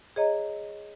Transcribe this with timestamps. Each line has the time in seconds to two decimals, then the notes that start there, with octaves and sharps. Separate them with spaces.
0.16 G#4 C#5 D#5 A#5